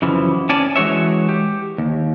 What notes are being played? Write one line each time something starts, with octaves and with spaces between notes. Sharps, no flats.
F#2 C#3 E3 F3
C#4 C#5 D5 G#5 A5
E3 G#3 F#4 C#5 E5
G4
D#2